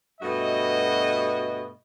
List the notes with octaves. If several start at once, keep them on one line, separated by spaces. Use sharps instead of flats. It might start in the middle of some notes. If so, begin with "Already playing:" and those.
G2 B2 A3 F#4 D#5